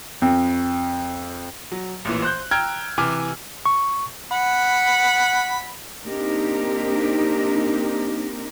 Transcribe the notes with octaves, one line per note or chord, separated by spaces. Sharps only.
F2
F#3
A1 A#2 E3
C5 F#6 G6
G5 A#5 E6 F6 G#6
C3 E3 G#5 D6 F6
C#6
F#5 B5
A#3 C4 D4 D#4 G4 A#4